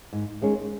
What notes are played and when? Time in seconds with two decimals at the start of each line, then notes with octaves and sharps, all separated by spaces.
0.13 G#2
0.42 D#3 G#3 C#4